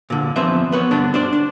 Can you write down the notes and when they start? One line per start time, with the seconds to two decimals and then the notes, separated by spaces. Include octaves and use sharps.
0.10 A#2 D3
0.36 E2 F3 C4 B4 E5
0.72 B3 B4 C#5
0.91 G2 D3 B3 D4
1.14 D4 C5 D5
1.33 D4